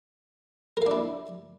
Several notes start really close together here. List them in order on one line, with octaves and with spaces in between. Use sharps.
A#4 F5 D4 E4